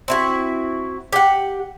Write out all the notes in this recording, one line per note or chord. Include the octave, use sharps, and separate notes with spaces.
C4 E4 F#4
G4 F#5